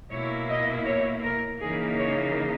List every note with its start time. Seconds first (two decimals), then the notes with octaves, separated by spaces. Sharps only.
0.11 B2 A#3 E4 C#5
0.49 D#5
0.86 C#5
1.23 A#4
1.60 C#3 E3 A#3 D#4 G#4
1.98 C#5